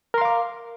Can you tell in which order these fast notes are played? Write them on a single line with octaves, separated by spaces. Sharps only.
A#4 C6 F5 D6